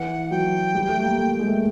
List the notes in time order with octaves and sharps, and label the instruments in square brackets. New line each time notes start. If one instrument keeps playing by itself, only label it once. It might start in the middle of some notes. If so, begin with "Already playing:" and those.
Already playing: [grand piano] E3 [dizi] F#5
[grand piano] F#3 [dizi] G5
[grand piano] G3
A3
A#3
A3
G#3
A3